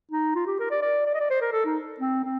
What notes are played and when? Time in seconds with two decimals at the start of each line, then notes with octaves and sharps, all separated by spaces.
0.11 D#4
0.35 F4
0.47 G4
0.59 A#4
0.71 D5
0.82 D5
1.06 D5
1.14 D#5
1.20 D5
1.30 C5
1.41 A#4
1.52 A4
1.65 D#4
2.00 C4
2.24 C4